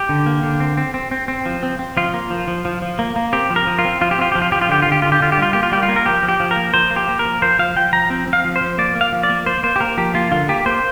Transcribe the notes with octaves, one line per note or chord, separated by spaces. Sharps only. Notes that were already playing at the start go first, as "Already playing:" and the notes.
Already playing: G4
D3
A#3
D3
C4
C4
C4
C4
C4
F3
C4
C4
F3 F4
A#3
F3
F3
F3
F3
A#3
A#3
C4 G4
F3
A#4
F3
F4
C4
F3 F4
G4
C4 F4
F3 G4
F4
F3 G4
F4
D3 G4
D3 F4
G4
D3 F4
G4
D3 F4
G4
G3 F4
A#3 G4
F4
G3 G4
F4
A#3
A#4
F3 G4
F3
G4
F3
A#4
A#3
F3 C5
A#3
G4
A#3
A#4
F3
F3 C5
F3 F5
F3 G5
F3 A#5
C4
C4
F5
F3
C5
F3
A#3 D5
A#3
F5
F3
D5
A#3
A#3 C5
A#3 C5
G4
A#3 A#4
F3 G4
A#3 F4
D3 F4
A#3 G4
A#3 C5